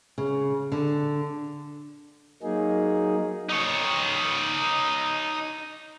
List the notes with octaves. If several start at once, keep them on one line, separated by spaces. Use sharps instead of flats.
C#3
D3
F#3 A#3 D#4 G#4
D#4 C#5